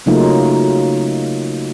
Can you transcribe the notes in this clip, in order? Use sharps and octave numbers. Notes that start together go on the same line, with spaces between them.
C#3 F#3 A3 A#3 D#4 F4